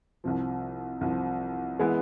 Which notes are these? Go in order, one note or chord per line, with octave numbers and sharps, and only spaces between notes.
C2 C3 F3
C2 C3 F3
E3 G#3 B3 E4